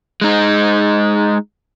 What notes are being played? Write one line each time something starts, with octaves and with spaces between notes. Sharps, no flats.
G#3 D#4